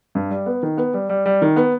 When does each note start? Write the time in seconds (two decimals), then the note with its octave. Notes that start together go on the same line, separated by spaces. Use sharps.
0.15 G2
0.30 G3
0.46 B3
0.63 D#3
0.77 B3
0.94 G3
1.09 G3
1.26 G3
1.42 D#3
1.56 B3